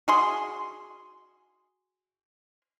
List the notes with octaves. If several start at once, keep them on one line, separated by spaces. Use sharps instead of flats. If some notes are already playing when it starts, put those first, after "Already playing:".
F#4 G#4 C6